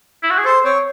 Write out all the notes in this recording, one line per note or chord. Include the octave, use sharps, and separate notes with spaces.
E4
F#4
G#4
A4 C5
C4 C#5